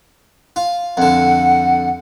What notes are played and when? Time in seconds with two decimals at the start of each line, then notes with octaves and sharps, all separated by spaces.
0.56 F4
0.97 F2 D3 F#5